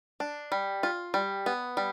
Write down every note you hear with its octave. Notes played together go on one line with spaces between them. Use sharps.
D4
G3
F4
G3
B3
G3